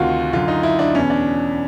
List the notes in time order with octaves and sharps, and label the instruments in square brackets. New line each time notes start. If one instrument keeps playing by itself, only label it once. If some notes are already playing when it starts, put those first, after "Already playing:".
Already playing: [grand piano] D2 C3 D#3 F4 F#4
F#2 D3 F4
D#4
E4
D4
E2 B2 C#4
D4